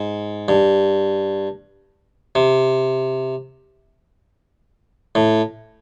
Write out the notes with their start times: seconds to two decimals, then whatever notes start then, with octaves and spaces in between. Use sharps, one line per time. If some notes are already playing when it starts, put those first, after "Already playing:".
Already playing: G#2
0.48 G2
2.35 C3
5.15 A2